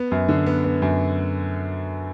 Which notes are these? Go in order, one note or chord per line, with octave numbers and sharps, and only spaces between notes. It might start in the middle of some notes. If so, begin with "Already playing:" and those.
Already playing: B3
F#2
D3
B3
B3
F#2